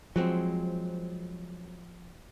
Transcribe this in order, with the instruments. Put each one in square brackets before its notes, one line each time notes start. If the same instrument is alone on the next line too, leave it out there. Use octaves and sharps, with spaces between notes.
[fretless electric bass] F3 [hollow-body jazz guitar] F#3 G#3 C4